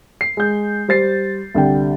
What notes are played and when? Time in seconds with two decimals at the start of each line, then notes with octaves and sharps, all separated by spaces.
0.21 C7
0.37 G#3 G6
0.88 G3 C5 A6 C7
1.55 C2 D3 G3 G5